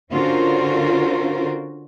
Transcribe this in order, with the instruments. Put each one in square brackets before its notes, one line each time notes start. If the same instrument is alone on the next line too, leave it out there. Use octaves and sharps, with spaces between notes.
[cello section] D3 C#4 F4 F#4 A#4 C5